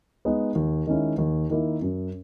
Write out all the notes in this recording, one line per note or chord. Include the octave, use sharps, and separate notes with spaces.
G#3 B3 D#4
D#2
D#3 G#3 C#4 E4
D#2
D#3 A#3 E4
F#2